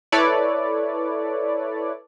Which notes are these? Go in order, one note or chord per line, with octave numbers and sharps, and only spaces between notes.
E4 A4 B4 C#5 D5